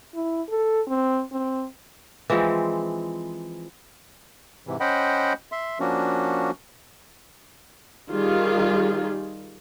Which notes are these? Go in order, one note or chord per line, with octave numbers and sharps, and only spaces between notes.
E4
A4
C4
C4
E3 F3 G#3 C4
G#2 C3 E3
C#4 C5 D#5 F#5 G5 B5
E5 C6
F3 A#3 C#4 D4 F#4
D#3 G3 F4 G#4